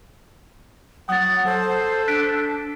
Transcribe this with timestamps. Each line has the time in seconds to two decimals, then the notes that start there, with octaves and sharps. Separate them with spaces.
1.09 F#3 F#5 D#6 A6
1.46 A4 C5
2.08 D4 F#6 B6 D7